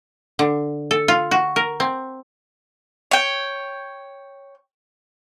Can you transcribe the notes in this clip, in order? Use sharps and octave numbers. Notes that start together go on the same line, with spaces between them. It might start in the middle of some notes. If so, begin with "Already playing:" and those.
D3
A4
F4
F#4
A#4
C4
C#5 G5